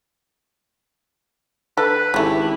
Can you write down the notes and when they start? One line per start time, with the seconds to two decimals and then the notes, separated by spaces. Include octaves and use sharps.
1.77 D3 A4 B4
2.14 G#1 C#3 A3 E4 G4